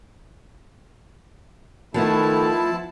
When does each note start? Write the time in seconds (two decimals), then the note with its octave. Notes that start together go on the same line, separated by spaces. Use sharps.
1.94 D#3 F3 A3 B3 E4 A5